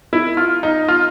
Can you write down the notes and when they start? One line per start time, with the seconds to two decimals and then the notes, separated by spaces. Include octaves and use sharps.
0.13 E4
0.37 F4
0.63 D#4
0.88 F4